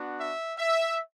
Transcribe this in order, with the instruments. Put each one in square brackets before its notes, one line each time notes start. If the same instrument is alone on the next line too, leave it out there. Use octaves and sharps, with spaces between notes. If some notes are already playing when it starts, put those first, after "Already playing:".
Already playing: [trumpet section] B3 D4 F#4
E5
E5